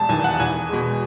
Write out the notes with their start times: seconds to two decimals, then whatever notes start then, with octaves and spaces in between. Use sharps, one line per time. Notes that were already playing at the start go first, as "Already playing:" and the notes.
Already playing: E1 A5
0.09 E2 D#3 G#5
0.24 F#5
0.40 E2 G#5
0.69 B2 G#3